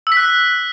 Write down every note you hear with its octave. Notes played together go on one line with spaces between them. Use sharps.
E6
B6
F#6